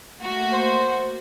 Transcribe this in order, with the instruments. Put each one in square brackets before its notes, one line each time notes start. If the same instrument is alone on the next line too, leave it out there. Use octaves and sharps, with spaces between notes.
[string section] A3 A#3 F#4
[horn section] C5